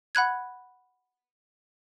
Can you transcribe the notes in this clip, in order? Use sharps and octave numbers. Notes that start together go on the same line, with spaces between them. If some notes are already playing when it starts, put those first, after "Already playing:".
F#5 B5 F#6 G#6